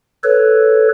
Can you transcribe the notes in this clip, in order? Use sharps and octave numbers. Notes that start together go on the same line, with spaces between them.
A4 B4 C#5